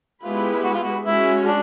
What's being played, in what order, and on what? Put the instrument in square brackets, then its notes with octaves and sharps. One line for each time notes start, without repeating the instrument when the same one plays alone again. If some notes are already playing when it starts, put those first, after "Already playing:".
[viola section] G#3 B3 E4 G4 B4 [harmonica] F4
[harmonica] F#4
F4
F#4
[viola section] G#3 C#4 F#4 [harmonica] E4
[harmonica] D4